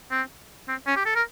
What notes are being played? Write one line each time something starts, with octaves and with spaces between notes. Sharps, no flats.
C4
C4
C#4
G4
A4
A#4